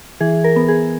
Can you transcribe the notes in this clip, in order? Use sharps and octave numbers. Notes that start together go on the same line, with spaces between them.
E3 G#4
A#4
B3
G#4